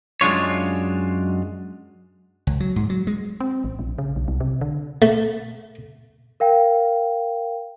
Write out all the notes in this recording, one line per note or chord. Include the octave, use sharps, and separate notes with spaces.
F#2 G#3 D4 F4 C#5
C#2
F#3
G#2
F#3
G#3
C4
A1
A#1
C#3
B1
C2
C3
D3
A3
A#4 F5 G5